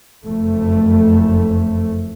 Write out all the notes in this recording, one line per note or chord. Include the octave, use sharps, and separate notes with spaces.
F#1 F2 A3